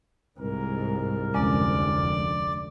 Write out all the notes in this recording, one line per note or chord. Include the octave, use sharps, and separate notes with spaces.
C2 G#2 A#4
F1 D2 F3 G#3 C#4 D5